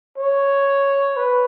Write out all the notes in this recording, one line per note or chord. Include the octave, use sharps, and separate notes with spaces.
C#5
B4